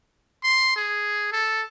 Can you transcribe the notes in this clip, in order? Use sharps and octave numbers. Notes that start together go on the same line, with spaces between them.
C6
G#4
A4